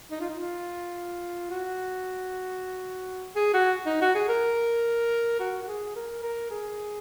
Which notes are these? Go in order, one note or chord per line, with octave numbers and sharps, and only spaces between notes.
D#4
F4
D#4
F4
F#4
G#4
F#4
D#4
F#4
G#4
A#4
F#4
F#4
G#4
A#4
A#4
G#4